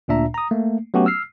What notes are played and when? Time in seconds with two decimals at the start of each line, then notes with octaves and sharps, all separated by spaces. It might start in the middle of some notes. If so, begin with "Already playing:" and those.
0.08 D2 A#2 D4 E5 A#5
0.34 A#5 D#6
0.51 A3 A#3
0.94 F#3 A3 B3 C#4 F#4 G4
1.06 E6 F6 C7